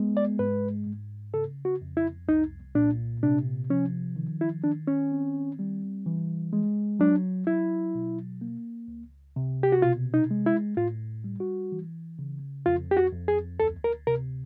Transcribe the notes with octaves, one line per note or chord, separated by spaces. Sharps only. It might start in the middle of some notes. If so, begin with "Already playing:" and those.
Already playing: G#3 B3
D5
G#2 B4
G#2
C#3 A4
F#4
F2
E4
C2 D#4
A#2 D4
C3 D4
F3 C#4
D#3
E4
D#3 D4
C#4
C4
G3
E3
G#3
F#3 D4
F#3 E4
B2
A#3
C#2
C3
G4
F#4
B2 F4
D#4
G#3
E4
A2 F4
G3
F#4
E3
C#3
F2 F4
G4
F#4
F2
G#4
D2 A4
A#4
C3 A#4